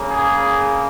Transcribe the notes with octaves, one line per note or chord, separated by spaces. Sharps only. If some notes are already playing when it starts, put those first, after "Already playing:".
Already playing: C#3 A#3
G#4